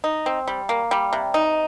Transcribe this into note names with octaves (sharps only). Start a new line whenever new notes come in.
D#4
C4
G3
A#3
G3
C3
D#4